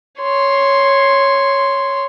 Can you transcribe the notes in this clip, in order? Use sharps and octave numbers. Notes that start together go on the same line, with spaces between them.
C#5 C6